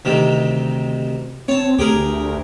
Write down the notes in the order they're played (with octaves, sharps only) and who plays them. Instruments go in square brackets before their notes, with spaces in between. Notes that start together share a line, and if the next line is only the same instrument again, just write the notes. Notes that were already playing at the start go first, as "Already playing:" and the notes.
[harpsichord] D2 C3 D#3
[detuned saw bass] C4 [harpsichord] C#5 A5
[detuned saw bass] D2 [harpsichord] G4 G#4 A#4